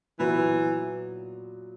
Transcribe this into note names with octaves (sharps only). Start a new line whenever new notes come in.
A#2 E3 F#3 B3